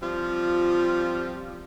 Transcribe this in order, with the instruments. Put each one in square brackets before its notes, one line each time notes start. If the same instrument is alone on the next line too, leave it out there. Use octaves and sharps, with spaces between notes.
[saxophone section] F3 G3 C4 F4